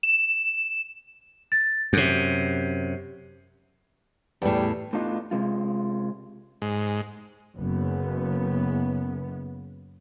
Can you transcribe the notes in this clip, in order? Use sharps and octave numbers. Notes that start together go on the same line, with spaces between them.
E7
A6
F#2 C3
E2 A2 G3
A2 B3 D4 D#4 F4
C3 G#3 F4
G#2
F#1 C#3 B3